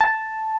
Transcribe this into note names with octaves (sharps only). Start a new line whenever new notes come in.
A5